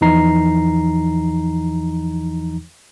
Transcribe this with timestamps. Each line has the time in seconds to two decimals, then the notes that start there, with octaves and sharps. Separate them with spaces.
0.01 E2 E3 F3 D#4 A#5 C7